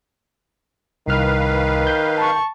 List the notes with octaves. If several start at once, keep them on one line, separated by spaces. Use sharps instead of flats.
C2 D#3 B4 F5 F6
G6
A5 C#6